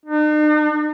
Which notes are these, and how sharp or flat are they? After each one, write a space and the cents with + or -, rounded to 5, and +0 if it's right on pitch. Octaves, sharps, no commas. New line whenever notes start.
D#4 -45